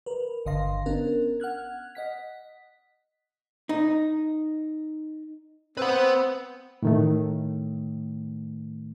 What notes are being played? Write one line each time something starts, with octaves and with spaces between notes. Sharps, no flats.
A#4 B4
G1 D3 D#5 F5 C6 A#6
B3 C#4 D4 A#4
F#5 F6 F#6 G#6
D#5 F#5 B6
D#4
C4 B4 F#5
A2 D#3 A3